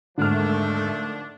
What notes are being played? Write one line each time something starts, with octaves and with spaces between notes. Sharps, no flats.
D#2 G#2 D3 D#3 F3 A3 D4 F6